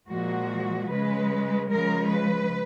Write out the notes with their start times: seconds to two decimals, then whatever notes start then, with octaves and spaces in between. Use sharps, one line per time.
0.10 A#2 F3 G#3 F#4
0.90 C#3 G#3 B4
1.69 C#3 F3 G#3 A#4
2.09 B4